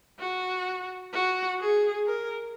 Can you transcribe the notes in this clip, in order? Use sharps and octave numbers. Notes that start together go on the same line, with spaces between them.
F#4
F#4
G#4
A#4